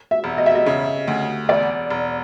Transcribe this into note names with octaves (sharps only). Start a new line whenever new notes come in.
E5
E1
D#5
E5
D#5
C#3
D2
E1 D5
E1